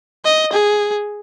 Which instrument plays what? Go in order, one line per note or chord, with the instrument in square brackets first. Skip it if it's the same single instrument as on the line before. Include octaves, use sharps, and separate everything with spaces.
[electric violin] D#5
G#4